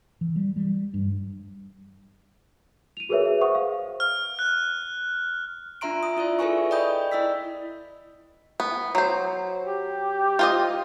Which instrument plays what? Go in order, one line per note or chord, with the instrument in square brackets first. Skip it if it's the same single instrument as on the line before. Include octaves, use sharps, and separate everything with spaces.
[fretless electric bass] E3
G3
G3
G2
[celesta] D#7 F7
F#4 G#4 A#4 B4 C#5 E5
G#4 E5
C5 F#5 C#6 D#6
F5
[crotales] F6
F#6
[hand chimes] D4 F4 E5 A#5 C6 D7
D#6
E4 F4 D5 E5
G#4 A4 B4 E5 G#5 C#6
D5 D#5 G5 B5 D#6 G6
E4 D5 D#5 E6 B6
[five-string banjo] B3
F#3 C5
[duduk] G4
[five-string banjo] F4 C5 D#5